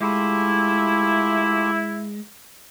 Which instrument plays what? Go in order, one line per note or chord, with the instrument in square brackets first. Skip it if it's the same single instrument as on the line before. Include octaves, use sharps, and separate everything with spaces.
[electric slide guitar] G#3 [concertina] A3 F4 G4 [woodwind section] E4